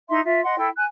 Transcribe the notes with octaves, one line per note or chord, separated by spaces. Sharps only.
D#4 E4 E5 C6
F4 E5
D#5 F#5 C6
E4 A4 G5
G#5 F#6